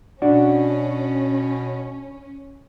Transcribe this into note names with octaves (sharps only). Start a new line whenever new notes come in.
B2 C#4 D4 F#4